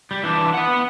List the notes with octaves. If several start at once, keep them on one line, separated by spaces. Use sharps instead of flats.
G3
E3 D4
B3 F#5